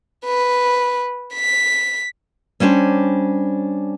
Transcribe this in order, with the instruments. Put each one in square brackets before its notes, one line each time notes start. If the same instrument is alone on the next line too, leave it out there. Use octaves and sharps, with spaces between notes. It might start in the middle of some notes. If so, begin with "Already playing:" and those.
[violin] B4
B6
[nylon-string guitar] G3 C#4 D4 C5 C#5